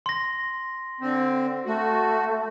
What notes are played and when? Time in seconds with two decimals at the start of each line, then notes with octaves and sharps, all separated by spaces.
0.06 C6 A#6
1.01 D3 C4
1.66 A3 F#4